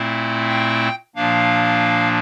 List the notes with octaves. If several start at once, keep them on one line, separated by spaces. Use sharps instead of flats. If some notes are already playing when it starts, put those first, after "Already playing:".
Already playing: A#2 A3 C4 E4
G5
A#2 F3 A#3 D4 F5